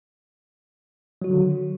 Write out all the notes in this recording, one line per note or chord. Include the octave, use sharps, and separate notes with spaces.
D3 D#3 F#3 F#4